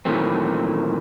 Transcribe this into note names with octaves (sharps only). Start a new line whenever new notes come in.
A#2 D#3 E3 F#3 A3 C4